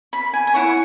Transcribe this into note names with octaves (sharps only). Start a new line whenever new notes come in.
B5
G#5
G#5
E4 C#5 F#5